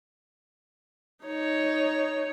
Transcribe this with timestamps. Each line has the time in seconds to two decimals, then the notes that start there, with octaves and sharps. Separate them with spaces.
1.25 D#4 C#5